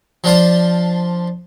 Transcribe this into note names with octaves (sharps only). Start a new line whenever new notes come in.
F3 D4 F4 C5